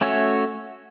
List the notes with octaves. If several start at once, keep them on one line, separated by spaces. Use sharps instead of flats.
A3 C#4 F#4 C#5 E5